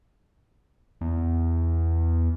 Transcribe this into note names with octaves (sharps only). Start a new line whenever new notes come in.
E2